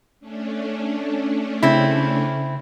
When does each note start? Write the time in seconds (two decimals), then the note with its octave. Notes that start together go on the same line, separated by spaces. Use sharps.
0.20 A3 C#4 D4
1.63 C#3 C4 E4 B5